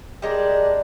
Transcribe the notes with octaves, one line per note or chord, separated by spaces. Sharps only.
G3 G#3 A#3 D4